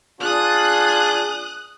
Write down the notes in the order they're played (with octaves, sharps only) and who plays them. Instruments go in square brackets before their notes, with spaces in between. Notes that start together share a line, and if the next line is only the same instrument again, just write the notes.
[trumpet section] D4 F4 G#4 [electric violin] D#6 F#6